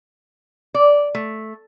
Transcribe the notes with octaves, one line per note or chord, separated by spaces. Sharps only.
D5
A3